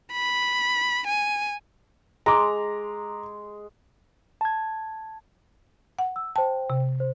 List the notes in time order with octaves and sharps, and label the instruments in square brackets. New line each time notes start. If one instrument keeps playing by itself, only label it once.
[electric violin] B5
G#5
[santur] G#3 [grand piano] A#5 D6
[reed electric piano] A5 G#6
[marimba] F#5
[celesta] E6
[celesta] C5 G5 [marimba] A5
[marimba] C3
[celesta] C5